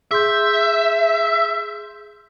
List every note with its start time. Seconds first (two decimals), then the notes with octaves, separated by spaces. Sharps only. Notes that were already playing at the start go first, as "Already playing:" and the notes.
0.11 G#4 E5 C6 G6